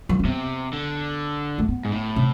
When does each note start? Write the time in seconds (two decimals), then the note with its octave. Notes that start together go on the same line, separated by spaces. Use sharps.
0.09 F3
0.19 C4
0.24 C3 B3
0.73 D3
1.58 A3
1.68 B3
1.85 G#2
1.92 A2
2.16 C3